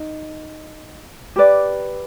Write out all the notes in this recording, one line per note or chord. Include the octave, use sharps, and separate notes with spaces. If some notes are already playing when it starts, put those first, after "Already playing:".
Already playing: D#4
G4 B4 D5